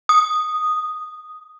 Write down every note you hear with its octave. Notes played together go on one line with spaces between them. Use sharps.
D#6